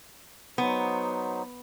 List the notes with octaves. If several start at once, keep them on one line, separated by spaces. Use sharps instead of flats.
F#3 B3 D#4 C5